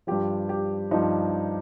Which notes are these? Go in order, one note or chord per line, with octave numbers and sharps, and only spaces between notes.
G2 F3 G4
G4
G2 F3 D#4